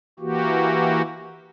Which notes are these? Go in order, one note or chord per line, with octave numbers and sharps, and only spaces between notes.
E3 A#3 F#4 G4